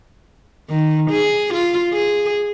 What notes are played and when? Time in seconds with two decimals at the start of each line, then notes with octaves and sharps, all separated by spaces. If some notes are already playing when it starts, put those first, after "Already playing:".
0.70 D#3
1.10 G#4
1.54 F4
1.93 G#4